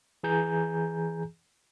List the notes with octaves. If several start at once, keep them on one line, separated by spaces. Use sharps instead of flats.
E3 G#4 G#5 A#5 G6